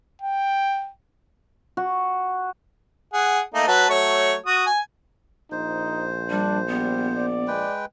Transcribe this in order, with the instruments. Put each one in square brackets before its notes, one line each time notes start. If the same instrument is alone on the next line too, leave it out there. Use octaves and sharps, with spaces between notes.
[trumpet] G5
[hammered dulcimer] F#4
[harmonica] G#4 F#5
A3 A#3 D#4
F#3 B4 A5
F#3 A3 C#5
F#4 D#6
G#5
[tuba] A#1 [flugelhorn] D#4 [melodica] C5
[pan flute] G3 [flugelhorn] D4
[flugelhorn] G3 [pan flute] B3
[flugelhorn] D5
[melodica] G#3 B4 G5